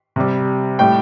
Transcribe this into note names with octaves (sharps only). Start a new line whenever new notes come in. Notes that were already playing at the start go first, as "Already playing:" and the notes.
C3 G3
A2 G3 G5